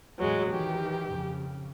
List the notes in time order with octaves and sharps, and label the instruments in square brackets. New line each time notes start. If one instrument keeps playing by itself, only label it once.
[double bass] E2 A2 [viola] F#3 G#3
[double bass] D#3 E3 [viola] G4
[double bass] F2 C#3